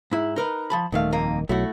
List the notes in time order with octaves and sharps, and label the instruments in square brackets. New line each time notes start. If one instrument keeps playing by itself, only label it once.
[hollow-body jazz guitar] G#2 E4
D#4 A#4 B4
F3 A5 B5
[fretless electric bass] D#1 D#3 [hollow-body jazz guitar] D2 A3 F5
[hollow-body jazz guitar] F2 A#3 D#4
[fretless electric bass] B1 F#3 [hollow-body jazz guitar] A3 E4 F#4